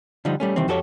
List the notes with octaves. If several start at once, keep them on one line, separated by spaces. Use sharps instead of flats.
D3 F3 G3 D#4
G3 A3 C#4
C2 D#3 E3 G3 C4
F2 F#4 G4 A4 A#4 C#5